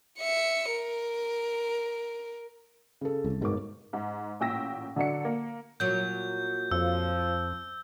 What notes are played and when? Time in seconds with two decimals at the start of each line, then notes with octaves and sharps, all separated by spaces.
0.19 E5 C#7
0.71 A#4
3.01 C#3 A4
3.24 C2
3.41 G1 G#2 B2 A#4 D6
3.93 G#2
4.40 A1 A#2 G5 E6 A#6 B6
4.96 D3 F#3 D4 C#7
5.25 A#3
5.80 A#2 F#3 G6
6.71 F2 F3 E6